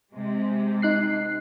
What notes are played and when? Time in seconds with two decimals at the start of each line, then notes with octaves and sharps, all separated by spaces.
0.13 C3 G#3
0.82 D#4 F#6 C7